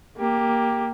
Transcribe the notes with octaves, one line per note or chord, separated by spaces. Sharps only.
A#3 G4